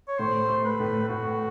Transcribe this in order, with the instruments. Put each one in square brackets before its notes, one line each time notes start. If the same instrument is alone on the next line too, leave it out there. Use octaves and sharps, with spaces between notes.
[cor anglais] C#5
[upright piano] A2 [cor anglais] C5
[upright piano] A3
[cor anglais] B4
[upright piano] A2
[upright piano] A2 [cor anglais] F#4